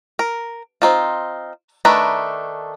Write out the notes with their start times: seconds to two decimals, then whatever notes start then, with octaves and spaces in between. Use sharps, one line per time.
0.19 A#4
0.82 C4 D#4 F4
1.85 D#3 A3 D4 B4 A#5